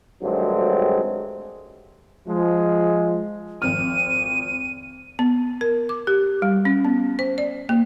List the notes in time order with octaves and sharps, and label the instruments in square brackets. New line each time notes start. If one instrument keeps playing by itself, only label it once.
[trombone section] G#1 G2 F#3 G#3 A3 C4
F3 G#3
[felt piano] G#1 F2 F6 [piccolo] D#7
[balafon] B3
A#4
D6
G4
G3
C#4
B3
C5
D5
A#3